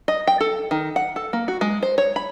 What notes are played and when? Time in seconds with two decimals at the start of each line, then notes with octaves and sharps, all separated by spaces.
0.08 D#5
0.27 G5
0.40 A4
0.71 D#3
0.96 F#5
1.16 A4
1.33 A#3
1.48 F#4
1.61 G#3
1.83 C5
1.98 C#5
2.16 B5